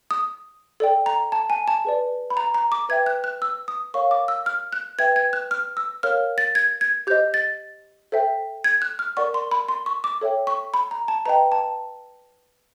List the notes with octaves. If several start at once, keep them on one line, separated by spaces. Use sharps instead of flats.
D#6
A4 D5 G5
A#5
A5
G#5
A5
G#4 B4 D5
B5
A#5
A#5
D6
B4 E5 G5 G#6
F#6
F#6
E6
D#6
A#4 C#5 F5 C#6
D6
E6
F6
F#6
B4 E5 G5 G#6
G#6
F#6
F6
E6
A#4 C#5 F5 F6
A6
G#6
G#6
G4 C5 D#5 G6
A6
A4 C5 E5 G5
G#6
F#6
F6
A#4 D5 F#5 C#6
C6
B5
C6
C#6
D6
A4 C#5 E5 G5
C#6
B5
A#5
A5
B4 D#5 G5 A#5
A5